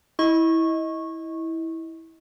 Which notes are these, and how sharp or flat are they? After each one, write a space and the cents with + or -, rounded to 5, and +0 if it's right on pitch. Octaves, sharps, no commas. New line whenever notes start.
E4 -15 D#5 +20 C#6 -15